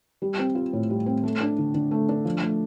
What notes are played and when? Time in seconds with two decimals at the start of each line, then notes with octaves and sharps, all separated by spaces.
0.22 G3
0.39 C4
0.55 F4
0.73 A2
0.90 G3
1.06 C4
1.23 A3
1.41 D4
1.58 D3
1.74 D3
1.91 A3
2.09 D4
2.25 F3
2.42 A3